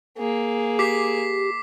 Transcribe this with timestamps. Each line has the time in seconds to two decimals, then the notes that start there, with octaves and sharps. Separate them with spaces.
0.18 A#3 G#4
0.79 G4 D6 B6 C7